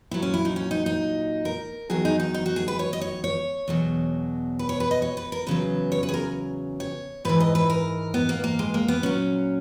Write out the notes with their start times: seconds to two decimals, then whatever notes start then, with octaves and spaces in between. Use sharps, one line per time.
0.11 A#2 F#3 E4
0.22 C#4
0.34 E4
0.45 D#4
0.56 C#4
0.71 D#4
0.86 D#4
1.45 A#4
1.90 E2 D#3 F#3 G#4
2.05 D#4
2.20 D#4
2.34 D#4
2.46 F#4
2.56 G#4
2.68 B4
2.79 C#5
2.93 D#5
3.01 C#5
3.24 C#5
3.68 E2 B2 F#3
4.59 B4
4.69 C#5
4.80 B4
4.91 D#5
5.02 C#5
5.17 B4
5.32 A#4
5.47 E2 C#3 F#3 B4
5.92 C#5
6.03 B4
6.09 G#4
6.14 A#4
6.80 C#5
7.25 G#2 E3 B4
7.40 D#5
7.55 B4
7.70 A#4
8.14 B3
8.29 A#3
8.44 A#3
8.59 G#3
8.74 A#3
8.88 B3
9.03 A#2 F#3 C#4